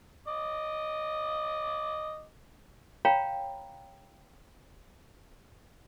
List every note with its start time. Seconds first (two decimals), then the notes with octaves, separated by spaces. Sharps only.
0.27 D#5 D6
3.05 C#5 F5 G5 A#5 B5